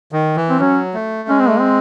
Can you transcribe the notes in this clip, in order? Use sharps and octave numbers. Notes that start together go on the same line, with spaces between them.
D#3
E3
C4
F#3 C#4
A3
G#3 C#4
C4
A3
C4